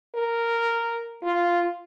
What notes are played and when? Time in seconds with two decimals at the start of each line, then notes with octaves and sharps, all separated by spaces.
0.15 A#4
1.23 F4